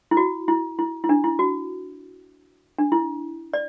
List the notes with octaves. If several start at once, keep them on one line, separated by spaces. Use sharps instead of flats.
E4
F#4
E4
E4
E4
D4
E4
F#4
D4
E4
D5